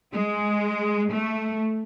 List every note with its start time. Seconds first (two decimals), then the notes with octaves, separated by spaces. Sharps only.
0.13 G#3
1.12 A3